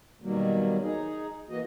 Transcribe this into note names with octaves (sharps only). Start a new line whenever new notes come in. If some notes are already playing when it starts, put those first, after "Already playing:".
B2 D#3 F#3 G3 A#3
D#4 G#4
E3 A#3 F#4 D#5